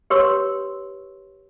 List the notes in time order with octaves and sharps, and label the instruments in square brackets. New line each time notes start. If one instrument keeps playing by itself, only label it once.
[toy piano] G4 B4 C#5 C6 C#6 E6